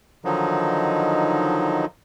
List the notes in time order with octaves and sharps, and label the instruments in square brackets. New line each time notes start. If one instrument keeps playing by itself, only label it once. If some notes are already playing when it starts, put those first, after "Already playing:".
[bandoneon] D3 D#3 F3 F#3 D#4